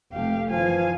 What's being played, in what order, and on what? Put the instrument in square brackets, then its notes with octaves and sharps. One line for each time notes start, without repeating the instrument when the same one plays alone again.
[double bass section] F1 A3 [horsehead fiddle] G4 F5
[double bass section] F#2 E3 [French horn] F3 [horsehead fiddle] F5 G#5